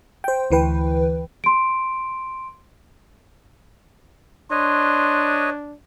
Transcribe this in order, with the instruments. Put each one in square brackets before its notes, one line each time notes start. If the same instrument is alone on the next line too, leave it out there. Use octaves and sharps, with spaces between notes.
[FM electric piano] C5 G5
D2 E3 B4 G5
[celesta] C6 D7
[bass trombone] D4 [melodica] B4 C#5 D#5 [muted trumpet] C6